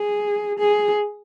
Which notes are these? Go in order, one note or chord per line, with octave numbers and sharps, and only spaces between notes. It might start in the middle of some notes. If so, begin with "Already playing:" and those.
Already playing: G#4
G#4